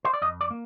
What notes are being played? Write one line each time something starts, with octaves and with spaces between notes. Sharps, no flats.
C5
D5
F2 D#5
D5
A#3